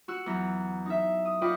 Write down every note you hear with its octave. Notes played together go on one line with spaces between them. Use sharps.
F#4 E6 F#6
E2 F#3 A#5
D#4 E5
D#6
F4 F#4 B4 D5 D#5 G5